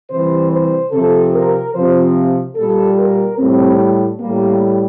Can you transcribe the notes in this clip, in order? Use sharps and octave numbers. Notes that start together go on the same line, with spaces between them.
C3 E3 G3 C5
C5
C3 F3 A4
A#4
C3 F3 C5
A#2 G3 A4
A#4
A2 G3 C4
A2 G3 A#3